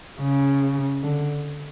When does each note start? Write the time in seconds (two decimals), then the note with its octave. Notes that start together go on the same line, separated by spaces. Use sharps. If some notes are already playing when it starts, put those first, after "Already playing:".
0.20 C#3
1.03 D3